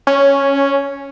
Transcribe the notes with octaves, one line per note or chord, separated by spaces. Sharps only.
C#4